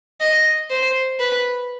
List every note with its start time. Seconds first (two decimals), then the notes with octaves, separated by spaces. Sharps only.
0.21 D#5
0.70 C5
1.20 B4